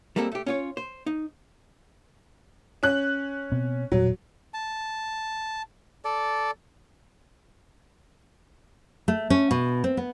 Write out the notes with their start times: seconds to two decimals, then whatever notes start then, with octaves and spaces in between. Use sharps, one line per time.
0.16 G3 G#3 A#3 C4 A4
0.32 A3 G4
0.46 C#4 F4 C#5
0.77 C5
1.06 D#4
2.83 C#4 F#6
3.52 B2 B3 C4
3.92 E1 A#2 F#3
4.54 A5
6.05 A4 D5
9.08 A3
9.30 C#4
9.51 B2
9.84 C4
9.97 B3